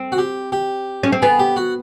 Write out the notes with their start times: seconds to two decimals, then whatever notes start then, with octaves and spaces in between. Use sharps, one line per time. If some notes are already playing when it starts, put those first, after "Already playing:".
Already playing: C4
0.12 F#4
0.18 G4
0.52 G4
1.03 C#4
1.12 C4
1.22 B3 G#4
1.39 G4
1.56 F#4